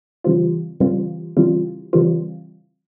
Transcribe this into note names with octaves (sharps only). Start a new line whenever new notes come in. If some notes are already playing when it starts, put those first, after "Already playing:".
C#3 E3 G3 C4 F4
C#3 E3 G3 C4 F4
C#3 E3 G3 C4 F4
C#3 E3 G3 C4 F4